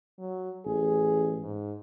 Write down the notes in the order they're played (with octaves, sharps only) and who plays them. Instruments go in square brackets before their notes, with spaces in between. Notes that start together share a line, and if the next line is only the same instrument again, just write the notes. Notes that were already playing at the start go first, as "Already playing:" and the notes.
[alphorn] F#3
[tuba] A1 [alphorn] G#4
[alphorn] G#2